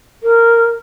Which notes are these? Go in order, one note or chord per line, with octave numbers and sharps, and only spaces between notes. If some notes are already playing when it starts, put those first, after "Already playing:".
A#4